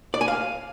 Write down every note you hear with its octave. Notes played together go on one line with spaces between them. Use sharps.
D5
G#5
F5